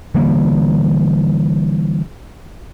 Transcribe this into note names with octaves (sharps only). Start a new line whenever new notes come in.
D3 E3 G3 A#3